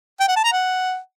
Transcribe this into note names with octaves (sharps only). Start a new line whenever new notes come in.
G5
F#5
A5
A#5
F#5